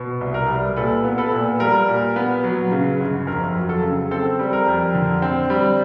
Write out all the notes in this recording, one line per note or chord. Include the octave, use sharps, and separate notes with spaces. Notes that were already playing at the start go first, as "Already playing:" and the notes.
Already playing: B2
C2
A#4
G3
A#2 A4 B4
B3
A4 B4
A#2
G3 A#4
A#2
B3
F#3
C#3
G1
F2 A#4
F#3
A4
C#3
C4 A4
G3
A#4
F2
D3
C4
G3